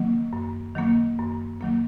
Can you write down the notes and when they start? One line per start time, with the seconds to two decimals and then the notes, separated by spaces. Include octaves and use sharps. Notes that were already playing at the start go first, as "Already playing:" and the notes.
Already playing: D#3 F#3 A#3
0.33 F#2
0.75 D#3 F#3 A#3
1.19 F#2
1.61 D#3 F#3 A#3